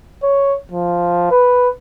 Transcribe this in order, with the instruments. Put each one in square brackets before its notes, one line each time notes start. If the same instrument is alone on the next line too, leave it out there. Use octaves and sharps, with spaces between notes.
[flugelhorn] C#5
F3
B4